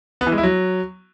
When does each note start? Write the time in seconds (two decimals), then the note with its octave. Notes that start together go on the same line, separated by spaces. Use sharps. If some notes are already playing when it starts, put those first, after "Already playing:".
0.21 B3
0.27 E3
0.32 G#3
0.38 E4
0.43 F#3